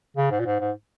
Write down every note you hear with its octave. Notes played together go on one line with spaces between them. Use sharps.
C#3
G#2
A#2
G#2
G#2